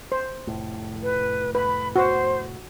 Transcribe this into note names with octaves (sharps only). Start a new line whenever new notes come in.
C5
F1 A2
B4
B4 B5
F#4 C5